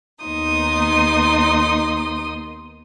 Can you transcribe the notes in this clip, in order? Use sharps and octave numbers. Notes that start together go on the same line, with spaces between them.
D#2 B3 D#4 C6 D#6